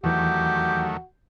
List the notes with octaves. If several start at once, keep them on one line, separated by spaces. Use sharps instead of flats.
E2 D#3 E3 F#3 A3 F#4 G4